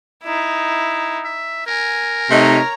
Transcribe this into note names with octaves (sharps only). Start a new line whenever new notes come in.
D#4 E4
E5
A#4 G#5
C3 A3 D#4 C#5 A#5